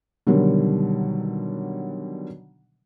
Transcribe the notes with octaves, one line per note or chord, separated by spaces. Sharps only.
B2 D3 D#3 F#3 G3